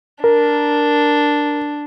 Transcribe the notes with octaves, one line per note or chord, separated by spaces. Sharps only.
D4 A#4